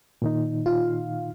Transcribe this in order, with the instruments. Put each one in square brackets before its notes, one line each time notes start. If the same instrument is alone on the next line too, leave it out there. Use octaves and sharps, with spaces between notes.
[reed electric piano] A#2 D#3 D#4
[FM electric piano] F4 F5